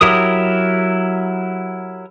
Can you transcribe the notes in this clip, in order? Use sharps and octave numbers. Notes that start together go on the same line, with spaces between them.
F#3 E4 G4 A#4 D#6